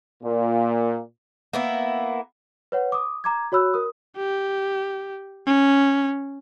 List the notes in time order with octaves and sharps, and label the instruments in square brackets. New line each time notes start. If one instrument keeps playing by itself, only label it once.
[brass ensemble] A#2
[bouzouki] A#3 B3 E4
[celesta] B4 C#5 F#5
D6 D#6
A#5 D6 G#6
F#4 C#5 B5 E6 F#6
A#4 D#6
[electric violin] G4
C#4